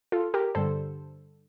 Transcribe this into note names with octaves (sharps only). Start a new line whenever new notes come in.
F4 A4
G4 A#4
G2 D3 G3 A4 C5